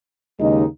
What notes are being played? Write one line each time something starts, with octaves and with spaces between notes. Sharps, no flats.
D#2 C#3 G#3 D#4